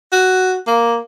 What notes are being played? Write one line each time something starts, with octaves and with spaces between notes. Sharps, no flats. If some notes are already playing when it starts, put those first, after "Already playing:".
F#4
A#3